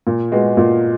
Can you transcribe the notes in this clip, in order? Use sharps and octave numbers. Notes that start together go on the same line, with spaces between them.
A#2
G#3 B3 F#4
A#2